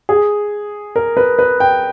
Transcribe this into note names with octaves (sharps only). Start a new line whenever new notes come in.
G#4
A#4
B4
B4
G5